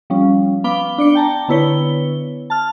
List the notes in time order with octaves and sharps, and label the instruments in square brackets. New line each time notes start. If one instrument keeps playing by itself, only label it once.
[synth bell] F3 G3 C#4
B3 F5 B5 D6 G7
D4 D5 C#7 G7
G5 A5 A#5
D3 B3 E4 B4 C#5 G7
A5 F6